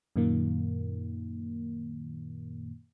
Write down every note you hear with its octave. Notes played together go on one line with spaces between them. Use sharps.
F#2 A#2 D#3 A#3